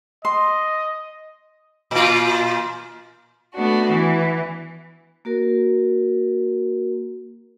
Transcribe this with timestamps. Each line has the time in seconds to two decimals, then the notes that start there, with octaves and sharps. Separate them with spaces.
0.25 D#5 C6
1.91 A#2 F4
3.54 A3 B3 D4 F#4
3.90 E3
5.25 A#3 F#4 A#4